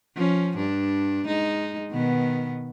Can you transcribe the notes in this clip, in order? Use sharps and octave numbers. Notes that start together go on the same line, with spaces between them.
F3 C#4
G2 D4
G#3 D#4
B2 D#3 B3